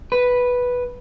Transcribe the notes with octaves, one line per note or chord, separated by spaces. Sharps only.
B4